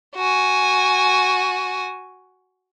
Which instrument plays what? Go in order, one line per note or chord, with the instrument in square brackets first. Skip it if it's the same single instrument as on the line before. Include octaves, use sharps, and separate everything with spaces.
[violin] F#4 G#5